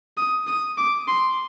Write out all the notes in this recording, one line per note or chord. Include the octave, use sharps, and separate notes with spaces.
D#6
D#6
D6
C6